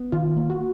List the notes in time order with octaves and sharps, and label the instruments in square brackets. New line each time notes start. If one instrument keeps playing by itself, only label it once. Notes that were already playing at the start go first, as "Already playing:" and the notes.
Already playing: [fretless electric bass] B3
[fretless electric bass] D#3 [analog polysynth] F4
[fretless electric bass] A#3
[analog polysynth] F#4